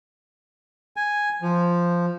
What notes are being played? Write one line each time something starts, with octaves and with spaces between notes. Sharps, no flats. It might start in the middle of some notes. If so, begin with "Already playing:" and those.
G#5
F3